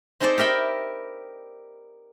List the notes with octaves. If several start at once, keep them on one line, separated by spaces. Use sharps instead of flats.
C4 D#4 G#4 A4 C5 D5
G4 A#4 E5 G5 B5